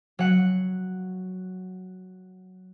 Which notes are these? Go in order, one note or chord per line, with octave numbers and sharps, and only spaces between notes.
F#3 F#5